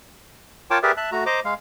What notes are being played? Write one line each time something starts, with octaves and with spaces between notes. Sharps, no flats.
F4 A#4 C#5 G5 A5 D6
G4 G#4 A#4 B4 D5 E5
E5 A5 F#6
A3 F#4 A#5
C5 D#5 A#5 D6
G#3 F5